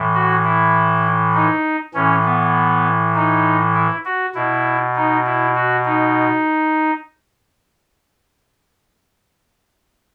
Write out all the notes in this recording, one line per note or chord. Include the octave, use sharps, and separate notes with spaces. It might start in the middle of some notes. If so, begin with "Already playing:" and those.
Already playing: A2 E3
F#4
E4
D#4
A2 E3 C#4
B3
D#4
E4
F#4
B2 E4
D#4
E4
F#4
D#4